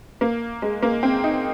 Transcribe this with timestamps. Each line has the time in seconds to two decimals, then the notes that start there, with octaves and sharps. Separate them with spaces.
0.21 A#3
0.62 G#3
0.83 A#3
1.03 C4
1.24 D#4